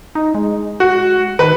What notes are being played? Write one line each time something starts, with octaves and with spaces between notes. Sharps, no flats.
D#4
G#3
F#4
D#3 B4